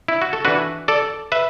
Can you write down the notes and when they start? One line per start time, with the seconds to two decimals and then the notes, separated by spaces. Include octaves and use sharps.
0.08 E4
0.22 F#4
0.33 A4
0.45 E3 D4 F#4 B4
0.88 A4 D5
1.32 B4 E5